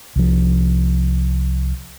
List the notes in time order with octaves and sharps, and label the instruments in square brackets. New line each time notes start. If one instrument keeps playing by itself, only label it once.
[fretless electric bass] C2 F3